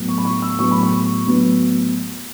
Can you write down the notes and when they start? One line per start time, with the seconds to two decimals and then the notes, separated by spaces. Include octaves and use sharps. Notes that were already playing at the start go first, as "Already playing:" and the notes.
Already playing: A2 F#3 B3
0.08 C#6
0.18 B5
0.25 C#6
0.42 E6
0.59 A2 F#3 B3 C#6
0.71 B5
0.83 C#6
1.26 A2 F#3 B3